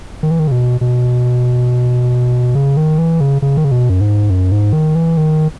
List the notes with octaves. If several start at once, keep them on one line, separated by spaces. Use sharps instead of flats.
D#3
E3
D#3
C#3
B2
B2
C#3
D#3
E3
C#3
C#3
D#3
C#3
B2
F#2
G#2
F#2
G#2
D#3
E3
D#3